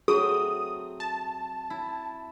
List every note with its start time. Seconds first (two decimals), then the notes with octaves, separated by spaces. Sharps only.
0.08 F#3 A3 C4 G#4 D#6
1.00 A5
1.70 E4